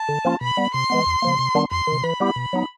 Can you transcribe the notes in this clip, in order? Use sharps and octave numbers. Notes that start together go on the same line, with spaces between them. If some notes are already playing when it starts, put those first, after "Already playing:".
Already playing: A5
D3
F3 A#3 C#4 F4
B2 B5
G3 B3
C3 C6
E3 G#3 B3
E2
C#3 F3 A#3
C3
D#3 G3 B3 D4
F2 C6
C3 D#3
E3 B5
G3 B3 E4 G4
B2
F#3 B3 D#4